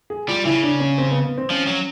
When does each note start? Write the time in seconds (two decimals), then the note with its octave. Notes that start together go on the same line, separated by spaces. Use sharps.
0.10 G#4
0.28 G3 F4
0.45 C#3 E4
0.63 D4
0.80 C#4
0.98 C4
1.11 B3
1.25 B3
1.38 C4
1.50 F3 C#4
1.67 F#3